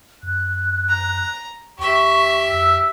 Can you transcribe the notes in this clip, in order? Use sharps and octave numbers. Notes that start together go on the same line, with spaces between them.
F#2 F#6
A#5
D#2 G4 E5 C#6
F2 E6